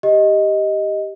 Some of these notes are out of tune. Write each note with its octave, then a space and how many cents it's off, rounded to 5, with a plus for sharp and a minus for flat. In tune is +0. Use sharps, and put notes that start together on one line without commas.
G4 +0 D#5 +5